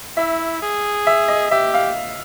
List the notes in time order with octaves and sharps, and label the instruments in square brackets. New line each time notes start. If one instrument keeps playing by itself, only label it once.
[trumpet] E4 [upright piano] E5
[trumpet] G#4
[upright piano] E5
D#5
[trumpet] G4 [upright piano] E5
[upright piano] F5